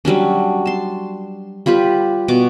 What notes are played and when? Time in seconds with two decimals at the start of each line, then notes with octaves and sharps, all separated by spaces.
0.05 F#3 G3 C#4 D4
0.66 A5 C6
1.66 G3 F4 G4 B4
2.28 B2 D6